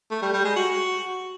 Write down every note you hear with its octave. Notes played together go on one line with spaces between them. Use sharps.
A3
G3
G3
G#3
F#4